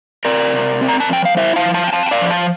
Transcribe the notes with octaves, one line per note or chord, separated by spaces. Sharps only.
C4 A#4 D5
C3
C4
A#5
A5
F3 G5
F5
E4 C5 E5
F5 A5
F3
F5 A5
G5
C4 F5 A5
G5
D5 F5
F3
F5 A5